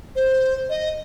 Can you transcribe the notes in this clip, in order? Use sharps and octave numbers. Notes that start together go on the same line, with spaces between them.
C5
D#5